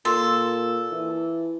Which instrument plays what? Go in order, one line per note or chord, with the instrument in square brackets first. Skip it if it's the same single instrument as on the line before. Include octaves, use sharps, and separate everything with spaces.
[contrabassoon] A#2 [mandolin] A4 [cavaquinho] C6
[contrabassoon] E3